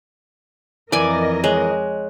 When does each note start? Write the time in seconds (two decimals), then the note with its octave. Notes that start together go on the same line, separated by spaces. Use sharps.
0.92 F2 E3 A#4 D5 D#5 G#5
1.44 G#3 C#5 F#6